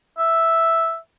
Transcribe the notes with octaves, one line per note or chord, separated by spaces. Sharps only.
E5